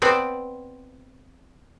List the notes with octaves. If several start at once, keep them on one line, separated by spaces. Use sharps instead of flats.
B3 C4 D5